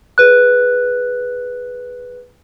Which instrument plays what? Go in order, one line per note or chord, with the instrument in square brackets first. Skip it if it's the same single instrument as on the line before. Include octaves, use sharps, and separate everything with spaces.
[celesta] G#4 B4 F#6